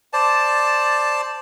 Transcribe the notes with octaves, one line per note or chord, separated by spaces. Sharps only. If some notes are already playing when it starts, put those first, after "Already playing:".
C5 D5 A5